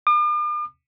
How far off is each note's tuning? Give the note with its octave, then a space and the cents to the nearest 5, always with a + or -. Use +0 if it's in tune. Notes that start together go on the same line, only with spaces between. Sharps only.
D6 +45